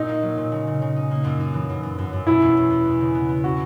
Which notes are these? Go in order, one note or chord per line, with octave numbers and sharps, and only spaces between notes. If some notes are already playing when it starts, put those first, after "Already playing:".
Already playing: A#2 D#4
A#3
F#3
A#2
C#3
C#3
C#3
D#4
A#3
F#2
D#4
E3
F#2
F#2
F#2
F#2
B2 E4
E2
E2
E2
G#3
C#3
B3
B3
C#4 F#4